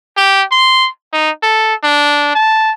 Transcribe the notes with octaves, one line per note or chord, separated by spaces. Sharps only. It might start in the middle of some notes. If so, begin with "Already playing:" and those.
G4
C6
D#4
A4
D4
A5